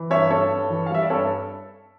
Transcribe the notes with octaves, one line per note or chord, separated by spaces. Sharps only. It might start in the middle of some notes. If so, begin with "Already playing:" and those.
Already playing: E3
G2 C#5 E5
G2 A4 C#5
G2
E3
F5
G3 E5
D5
G2 A4 C#5